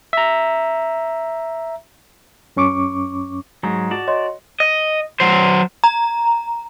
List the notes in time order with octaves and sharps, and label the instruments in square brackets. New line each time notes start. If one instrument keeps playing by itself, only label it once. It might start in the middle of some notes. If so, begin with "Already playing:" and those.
[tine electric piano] E5 A#5
[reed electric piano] F#2 C#4 C#6 D6
[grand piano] G#2 [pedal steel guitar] F#3
[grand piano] F#4 [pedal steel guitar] D5 A5
[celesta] C#5 D#5 C6
[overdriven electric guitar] D#5
F#3 C5
[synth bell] A#5